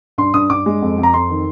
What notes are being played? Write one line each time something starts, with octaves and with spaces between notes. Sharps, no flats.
G2 C6
G2 D#6
G2 D6
G#3
F2
F2
A#5
F2 C6
D#3